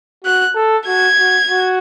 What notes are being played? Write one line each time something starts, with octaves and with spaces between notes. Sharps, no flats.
F#4 F#6
A4
F#4 G#6
F#4
F#4